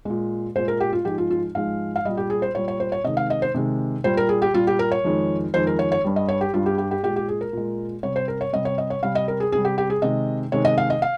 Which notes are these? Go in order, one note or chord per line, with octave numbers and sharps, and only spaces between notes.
A#2 G#3
A#2 G#3 C5
A#4
G4
F4
G#2 F3 G#3 G4
F4
F4
G#2 F3 G#3 F5
F5
A#2 G3 D#5
G4
G#4
C5
A#2 G3 C#5
C#5
C5
C#5
C3 D#3 G#3 D#5
F5
D#5
C5
C3 D#3 G#3
A#2 G3 C5
A#4
G#4
G4
A#2 G3 F4
G4
A#4
C#5
F2 D#3 G#3
F2 D#3 G#3 C5
A#4
C#5
C#5
G2 G3
D#5
C#5
G4
G2 G3 F4
G4
G4
G4
A#2 G#3 G4
G4
G#4
A#4
A#2 G#3
C3 G3 C#5
C5
A#4
C#5
C3 G3 D#5
C#5
D#5
C#5
C3 G3 F5
D#5
A#4
G#4
C3 G3 G#4
G4
G4
G#4
C3 D#3 G#3 D#5
C3 D#3 G#3 C#5
D#5
F5
D#5
F5